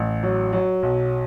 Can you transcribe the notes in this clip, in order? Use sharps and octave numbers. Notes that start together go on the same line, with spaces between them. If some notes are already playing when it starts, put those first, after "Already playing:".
Already playing: A1
F#3
F#3
B1